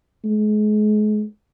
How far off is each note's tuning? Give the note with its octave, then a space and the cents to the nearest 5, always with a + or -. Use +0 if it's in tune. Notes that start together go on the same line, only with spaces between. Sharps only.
G#3 +35